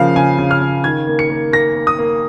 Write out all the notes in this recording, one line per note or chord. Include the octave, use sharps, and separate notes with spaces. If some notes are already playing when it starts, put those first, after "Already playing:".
Already playing: C#3 F3 A#3 F5
C#3 G#5
C#3
F6
C#3
D#3 G#6
A#3
C#7
A#3
A#3 A#6
A#3
D#6
A#3